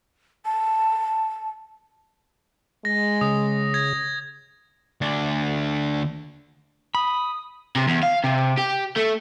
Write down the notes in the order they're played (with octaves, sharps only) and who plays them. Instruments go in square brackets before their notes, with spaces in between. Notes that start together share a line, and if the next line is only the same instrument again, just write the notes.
[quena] A5
[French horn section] G#3 [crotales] A#6
[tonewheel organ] C#3 [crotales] D#6
[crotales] G#6 A#6
[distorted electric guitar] D2 D4
[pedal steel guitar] B5 [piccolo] D#6
[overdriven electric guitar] C3
E2
F5
C3
G4
A3